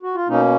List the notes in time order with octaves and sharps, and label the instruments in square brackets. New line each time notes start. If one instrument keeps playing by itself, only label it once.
[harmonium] F#4
F4
B2 A#3 C#4 D#4